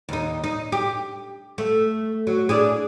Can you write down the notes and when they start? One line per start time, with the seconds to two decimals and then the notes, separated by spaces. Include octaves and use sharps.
0.09 D#2 D#4
0.44 D#4
0.72 G4
1.58 A3
2.27 F#3
2.49 D4 E4 G#4